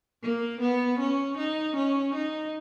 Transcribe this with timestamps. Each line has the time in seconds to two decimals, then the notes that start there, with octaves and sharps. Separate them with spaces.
0.23 A#3
0.61 B3
0.99 C#4
1.37 D#4
1.76 C#4
2.14 D#4